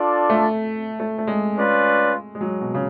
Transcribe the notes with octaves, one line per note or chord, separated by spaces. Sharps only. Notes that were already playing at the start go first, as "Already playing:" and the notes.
Already playing: D4 F4 A4 D5
A3
A3
A3
G#3
C#4 F4 B4 D5
G#3
F#3
B2
C#3